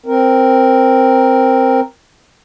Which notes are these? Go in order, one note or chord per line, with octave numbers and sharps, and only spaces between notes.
C4 A#4